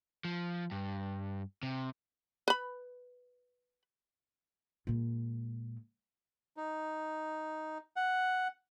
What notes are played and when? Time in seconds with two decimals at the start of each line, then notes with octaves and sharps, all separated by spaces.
0.25 F3
0.72 G2
1.63 C3
2.48 B4 B5
4.87 A#2 G#3
6.57 D#4
7.96 F#5